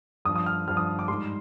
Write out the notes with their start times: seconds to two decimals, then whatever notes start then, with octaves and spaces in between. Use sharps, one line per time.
0.25 G2 D#6
0.29 F3
0.36 D#6
0.46 F6
0.68 G2 F3 F6
0.77 D#6
0.99 D6
1.08 G#2 G3 C6